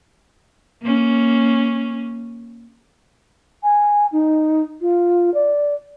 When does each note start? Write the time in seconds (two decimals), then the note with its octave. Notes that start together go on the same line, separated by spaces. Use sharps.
0.82 A#3 C#4
3.63 G#5
4.12 D#4
4.81 F4
5.34 D5